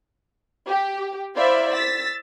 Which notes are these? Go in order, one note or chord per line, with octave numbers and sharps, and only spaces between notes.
G4
E4 C5 D5 E5 F5 B5
E6 A6 B6